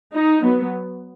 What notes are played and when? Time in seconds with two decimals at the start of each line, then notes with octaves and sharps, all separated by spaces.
0.13 D#4
0.43 F#3 B3